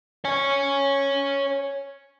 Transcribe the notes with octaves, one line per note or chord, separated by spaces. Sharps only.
C#5 G#5